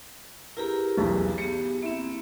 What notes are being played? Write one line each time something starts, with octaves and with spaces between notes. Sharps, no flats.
E4 G4 G#4 A#4 B4 A#5
B1 E2
B3 G4 G#4 C#7
A#3 C4 E4